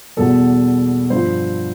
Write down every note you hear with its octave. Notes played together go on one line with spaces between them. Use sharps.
E2 B2 G3 A4
G2 F3 C5